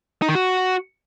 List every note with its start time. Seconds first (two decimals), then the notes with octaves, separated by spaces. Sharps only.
0.22 D#4
0.28 D#3
0.35 F#4